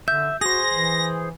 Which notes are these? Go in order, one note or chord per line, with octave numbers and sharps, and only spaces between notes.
D3 E5 G6
F#4 G#4 C5 A#6
E3